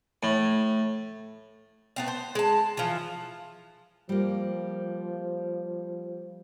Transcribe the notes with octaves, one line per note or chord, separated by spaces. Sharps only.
A2
A3 B3 C4
C5
G#3 A5
E3 F3
F3 G3 A#3